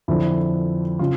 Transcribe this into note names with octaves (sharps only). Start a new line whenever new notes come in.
F2 D3 F3 E4
C#3 F4